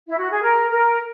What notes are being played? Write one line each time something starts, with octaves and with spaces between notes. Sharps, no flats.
E4
F#4
G#4
A#4
A#4